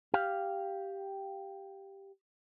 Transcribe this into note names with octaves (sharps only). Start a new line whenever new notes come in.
G4 F5